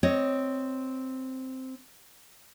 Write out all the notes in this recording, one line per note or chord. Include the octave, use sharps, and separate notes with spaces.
C4 C#5 D#5